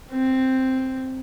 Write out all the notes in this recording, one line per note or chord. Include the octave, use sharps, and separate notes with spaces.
C4